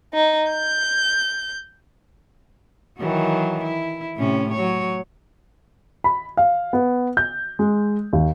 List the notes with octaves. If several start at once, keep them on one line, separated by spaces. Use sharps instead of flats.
D#4
G6
D#3 E3 F#3
E4
A2 C3 C#4
F#3 C#5
B5
F5
B3
G6
G#3
D#2